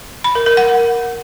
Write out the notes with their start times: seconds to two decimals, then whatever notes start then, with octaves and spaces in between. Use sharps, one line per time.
0.24 B5
0.35 A#4
0.46 A#4
0.57 F#5